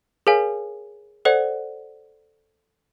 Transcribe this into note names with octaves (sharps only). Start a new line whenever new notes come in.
G#4 A#4 C#5 F5 G#5
A4 C5 D5 F#5